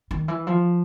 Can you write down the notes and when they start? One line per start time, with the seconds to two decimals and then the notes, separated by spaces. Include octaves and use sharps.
0.11 D#3
0.28 E3
0.47 F3